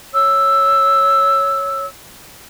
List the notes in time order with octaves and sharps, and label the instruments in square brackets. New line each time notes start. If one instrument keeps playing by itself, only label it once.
[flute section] C#5 D#6 E6